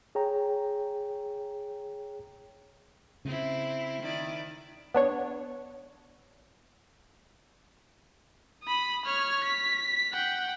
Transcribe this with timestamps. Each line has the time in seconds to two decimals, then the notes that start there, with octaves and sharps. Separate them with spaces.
0.15 G#4 C#5 G5 A#5
3.25 C#3 C4 E4
4.03 D#3 E4 D5
4.95 B3 D4 C#5
8.63 B5 D#6
9.05 C#5 F6
9.44 B6
10.12 F#5 G5